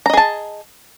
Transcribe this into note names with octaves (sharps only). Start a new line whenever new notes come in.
G#4 D#5 A5 A#5